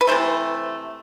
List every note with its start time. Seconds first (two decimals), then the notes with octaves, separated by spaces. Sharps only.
0.01 B4
0.07 C3 E3 A3 C5